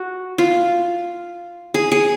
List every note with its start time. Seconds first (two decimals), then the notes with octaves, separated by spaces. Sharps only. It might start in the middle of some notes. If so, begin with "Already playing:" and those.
Already playing: F#4
0.38 F4
1.74 G#4
1.92 G#4